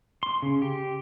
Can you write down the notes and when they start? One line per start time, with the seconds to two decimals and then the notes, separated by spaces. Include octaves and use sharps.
0.23 C6
0.42 C#3
0.62 G4